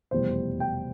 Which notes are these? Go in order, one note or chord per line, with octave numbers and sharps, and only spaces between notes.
F1 E2 B2 G3 C5
G5